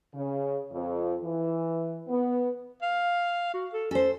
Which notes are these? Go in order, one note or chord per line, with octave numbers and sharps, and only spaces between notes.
C#3
F2
E3
B3
F5
F#4
A4
C#4 A4 C5